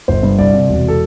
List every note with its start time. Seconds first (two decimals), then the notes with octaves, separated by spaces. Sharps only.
0.08 G1 C5
0.23 G2
0.38 C2 D5
0.54 C3
0.69 E1
0.88 A4